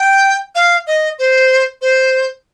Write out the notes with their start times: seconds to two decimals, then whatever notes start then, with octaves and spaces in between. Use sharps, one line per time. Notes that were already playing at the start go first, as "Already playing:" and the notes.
Already playing: G5
0.55 F5
0.87 D#5
1.19 C5
1.81 C5